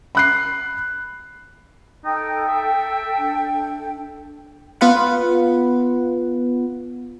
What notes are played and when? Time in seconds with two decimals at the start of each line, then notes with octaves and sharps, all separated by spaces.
0.15 B5 F#6 C7
2.05 D#4 A4 G5
2.48 E5
3.18 D4
4.81 B3 F4 B4 F#5